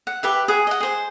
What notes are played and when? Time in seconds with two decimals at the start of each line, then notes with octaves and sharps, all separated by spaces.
0.07 F#5
0.23 G4 B4 E5
0.48 G#4 F#5
0.67 D#5 F#5
0.80 G#4 C5